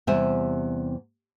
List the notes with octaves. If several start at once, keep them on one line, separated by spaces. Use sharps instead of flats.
E2 C3 G3 C5 E5 G#5